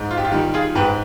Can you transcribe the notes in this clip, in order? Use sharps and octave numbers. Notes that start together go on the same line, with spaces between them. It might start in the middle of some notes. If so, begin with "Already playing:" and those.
Already playing: G#2
F4
G4
F4
D#3 G3 G4
F4 G#4
G#2 G4 B4